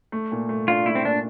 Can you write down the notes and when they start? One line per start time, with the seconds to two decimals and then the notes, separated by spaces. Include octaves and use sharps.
0.12 A3
0.32 A#2
0.49 A3
0.68 D4 F4
0.86 A3 E4
0.95 C4
1.04 A#2 D4